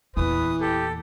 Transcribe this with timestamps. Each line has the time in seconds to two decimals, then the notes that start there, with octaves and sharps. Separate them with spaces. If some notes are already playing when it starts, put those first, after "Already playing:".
0.17 E2 A#2 E3 B4 D#6
0.61 G4 A4